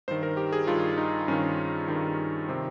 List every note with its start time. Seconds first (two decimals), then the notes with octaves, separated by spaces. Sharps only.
0.08 G2 C5
0.11 D#3
0.23 A#4
0.37 G4
0.53 G#4
0.67 G2 D#3 F4
0.97 D#4
1.28 G2 D#3 C#4
1.88 G2 D#3
2.48 C3 D#3 C4